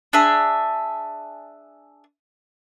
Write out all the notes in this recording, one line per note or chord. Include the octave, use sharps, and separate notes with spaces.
D4 G#4 E5